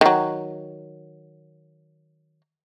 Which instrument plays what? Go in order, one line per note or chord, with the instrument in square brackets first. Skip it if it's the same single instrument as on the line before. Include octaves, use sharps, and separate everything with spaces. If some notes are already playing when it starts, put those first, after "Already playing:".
[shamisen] D#3 F#3